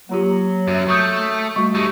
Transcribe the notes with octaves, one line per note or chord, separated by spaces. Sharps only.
F#3 A#3 F4 G4
F#2 F#4 E5
A3 C#6 D#6 G6
G3 A3 F#4 C#6
A3 D#4 G4